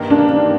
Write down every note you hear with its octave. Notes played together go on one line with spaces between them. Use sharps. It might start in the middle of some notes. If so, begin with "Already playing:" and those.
Already playing: G2 D#3 A#3
D4